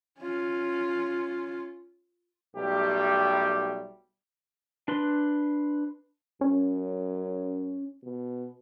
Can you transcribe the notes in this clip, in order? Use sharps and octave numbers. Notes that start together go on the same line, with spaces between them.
C#4 F4
B1 G3 A3 G4
D4 B4 C6
F#2 C#4
B2